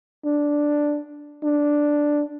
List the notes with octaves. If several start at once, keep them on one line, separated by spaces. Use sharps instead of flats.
D4
D4